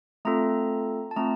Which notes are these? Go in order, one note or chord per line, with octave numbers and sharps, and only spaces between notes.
A3 C4 F4 A4 A#5
A5
A3 C4 F4 A#5